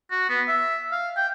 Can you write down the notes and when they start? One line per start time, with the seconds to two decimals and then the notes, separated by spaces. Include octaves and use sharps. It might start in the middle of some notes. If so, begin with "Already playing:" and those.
0.11 F#4
0.29 B3
0.48 E5
0.92 F5
1.16 G5